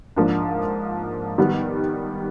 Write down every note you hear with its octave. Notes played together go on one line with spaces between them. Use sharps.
G#2 F3 A#3 D4
D#3 G3 B3